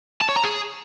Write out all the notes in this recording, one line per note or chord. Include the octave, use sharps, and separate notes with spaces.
A5
C#5
A#5
G#4